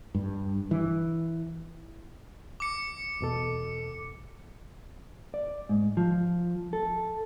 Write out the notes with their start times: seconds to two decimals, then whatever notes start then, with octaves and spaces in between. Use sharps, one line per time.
0.15 G2
0.71 E3
2.60 D6 C#7
3.21 E2 B2 A4
5.34 D5
5.69 G#2
5.97 F3
6.73 A4